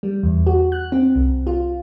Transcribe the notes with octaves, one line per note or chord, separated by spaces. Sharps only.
G3
E2
F#4
F#6
C4
C2
F4